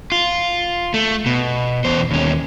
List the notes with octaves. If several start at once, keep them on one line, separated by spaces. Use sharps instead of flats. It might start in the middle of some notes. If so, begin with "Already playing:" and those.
F4
A3
B2
E2 C5
D#2 C#4